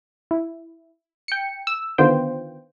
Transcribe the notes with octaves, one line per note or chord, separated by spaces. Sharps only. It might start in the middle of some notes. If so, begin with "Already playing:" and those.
E4
G5 C#7
E6
D3 D#3 B3 F4 C5 G5